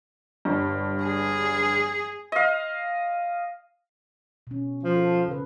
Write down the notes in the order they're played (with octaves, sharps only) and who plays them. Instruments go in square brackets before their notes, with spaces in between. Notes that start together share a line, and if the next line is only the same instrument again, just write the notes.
[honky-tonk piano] G1 G2
[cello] G#4
[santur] D#5 F5
[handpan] B2 C#4
[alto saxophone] F3
[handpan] A4
C#3 B4